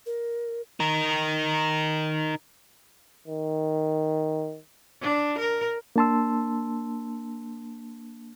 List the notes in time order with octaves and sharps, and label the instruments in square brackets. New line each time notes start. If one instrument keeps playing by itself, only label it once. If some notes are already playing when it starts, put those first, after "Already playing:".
[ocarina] A#4
[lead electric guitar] D#4 A#4
[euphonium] D#3
[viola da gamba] D4
A#4
[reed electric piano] A#3 D4 A5 C6 E6